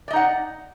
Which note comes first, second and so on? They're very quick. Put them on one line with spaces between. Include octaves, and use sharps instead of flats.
D5 D#5 D#4 F#5